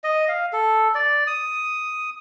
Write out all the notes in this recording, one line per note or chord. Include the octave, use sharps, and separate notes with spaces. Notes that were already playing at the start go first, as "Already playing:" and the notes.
D#5
F5
A4
D5
D#6